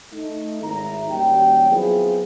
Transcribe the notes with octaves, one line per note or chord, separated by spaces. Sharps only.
A3 D#4
G#1 D#3 E4 E5 A#5
D#2 D#3 F#3 G3 C#4 G5
F#3 B3 C4 E4 F4 G#4